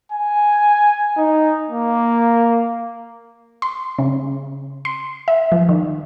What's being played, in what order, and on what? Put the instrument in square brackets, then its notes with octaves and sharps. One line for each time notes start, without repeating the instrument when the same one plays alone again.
[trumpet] G#5
D#4
A#3
[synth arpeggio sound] C6
C#3
C6
E5
F3
D#3